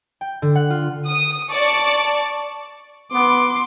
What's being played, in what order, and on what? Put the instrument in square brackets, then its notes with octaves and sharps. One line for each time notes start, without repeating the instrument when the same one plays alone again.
[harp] G5
D3
F#5
F4
[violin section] D#6
D5 A5 C#6 D6
[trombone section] B3 [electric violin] C6 D6